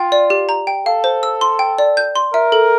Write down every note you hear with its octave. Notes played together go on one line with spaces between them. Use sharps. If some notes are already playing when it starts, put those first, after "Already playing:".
Already playing: F4 G5
D5
G4
A#5
G5
A4 F5
C5
E6
C6
G5
D5
G6
C6
A#4 E5
A4